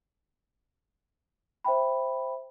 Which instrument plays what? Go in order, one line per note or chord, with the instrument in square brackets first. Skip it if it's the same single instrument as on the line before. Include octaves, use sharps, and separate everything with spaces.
[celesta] C5 E5 G5 B5